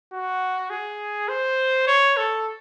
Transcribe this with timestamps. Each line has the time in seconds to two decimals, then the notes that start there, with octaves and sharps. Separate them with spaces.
0.13 F#4
0.70 G#4
1.28 C5
1.87 C#5
2.17 A4